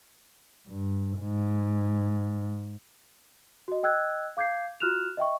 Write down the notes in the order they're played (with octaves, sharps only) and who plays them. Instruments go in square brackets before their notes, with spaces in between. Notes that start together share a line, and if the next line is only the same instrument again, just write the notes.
[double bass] G2
G#2
[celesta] F#4 D#5
D#5 G5 E6 F#6 G#6
F5 D6 G6 G#6 C7
F4 F#4 F6 F#6 E7 F7
D#5 E5 G5 C#6